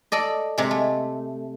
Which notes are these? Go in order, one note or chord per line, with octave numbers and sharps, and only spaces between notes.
A4 D5 D#5
C3 G#3
A3